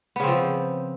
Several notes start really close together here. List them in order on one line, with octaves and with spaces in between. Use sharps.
B3 C#3 C4 F3